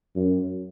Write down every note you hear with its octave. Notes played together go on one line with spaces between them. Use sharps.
F#2